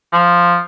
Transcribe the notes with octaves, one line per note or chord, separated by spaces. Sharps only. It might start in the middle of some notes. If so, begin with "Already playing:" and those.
F3